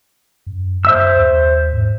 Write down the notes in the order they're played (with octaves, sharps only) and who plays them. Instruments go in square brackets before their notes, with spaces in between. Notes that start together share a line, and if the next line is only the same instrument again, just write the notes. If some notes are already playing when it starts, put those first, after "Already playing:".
[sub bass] F#2
[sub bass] F#2 [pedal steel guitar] C5 E5 E6
[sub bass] D#2
G#2